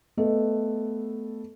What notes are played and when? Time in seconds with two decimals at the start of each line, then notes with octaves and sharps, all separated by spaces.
0.17 A3 B3 A4 D#5